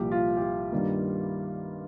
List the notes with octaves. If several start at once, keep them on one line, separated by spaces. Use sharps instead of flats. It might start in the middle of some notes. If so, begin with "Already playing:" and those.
Already playing: C2 A#2 F3 A#3 G4
F4
G4
F4
G2 D#3 G3 A#3